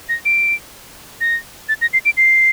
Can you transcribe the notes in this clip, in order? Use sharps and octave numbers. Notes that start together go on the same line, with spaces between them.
A#6
D7
A#6
A6
A#6
C7
D7
C7